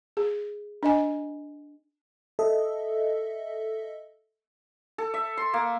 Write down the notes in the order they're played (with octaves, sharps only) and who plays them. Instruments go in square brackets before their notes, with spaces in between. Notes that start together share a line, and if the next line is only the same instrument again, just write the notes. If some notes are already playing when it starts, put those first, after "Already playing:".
[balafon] G#4
D4 D#5 G#5
[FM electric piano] A4 D#5 E5
[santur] A4
E5
C6
A#3